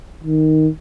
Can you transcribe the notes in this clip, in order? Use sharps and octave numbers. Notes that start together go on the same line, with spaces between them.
D#3